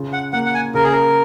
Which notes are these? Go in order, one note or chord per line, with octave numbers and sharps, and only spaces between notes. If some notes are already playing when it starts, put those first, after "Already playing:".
Already playing: C#3 F4
F#5
A#3 F#5
F#5
G#5
C#3 A#4
G#4
A#4